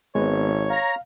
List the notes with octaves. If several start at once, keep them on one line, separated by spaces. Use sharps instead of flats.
G#1 G#3 B3 B4 C#5
F5 A#5